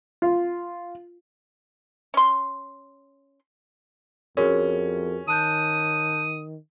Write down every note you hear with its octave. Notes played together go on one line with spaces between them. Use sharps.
F4
C#4 C6
F2 C#4 F#4 G#4 A#4
D#3 A5 D#6 F#6 G6